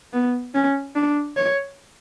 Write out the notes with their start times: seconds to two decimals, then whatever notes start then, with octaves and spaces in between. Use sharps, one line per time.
0.13 B3
0.55 C#4
0.96 D4
1.37 C#5